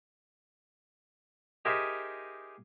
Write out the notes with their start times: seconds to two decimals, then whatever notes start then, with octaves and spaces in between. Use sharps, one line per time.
1.65 D#4 G4 G#4 A#4 C5 E5